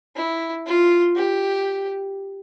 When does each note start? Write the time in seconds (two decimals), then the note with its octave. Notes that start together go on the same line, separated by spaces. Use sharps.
0.16 E4
0.66 F4
1.17 G4